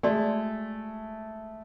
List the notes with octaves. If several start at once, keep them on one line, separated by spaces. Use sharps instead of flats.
G#3 A3 F#4 D5 C6